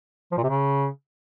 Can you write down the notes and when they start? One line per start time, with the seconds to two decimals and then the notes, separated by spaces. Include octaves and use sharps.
0.32 F3
0.38 A#2
0.43 C3
0.49 C#3